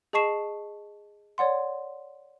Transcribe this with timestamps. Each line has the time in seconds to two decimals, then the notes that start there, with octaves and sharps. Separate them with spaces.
0.13 G#4 D#5 A5 C#6 C7 E7
1.38 C#5 D5 F#5 C6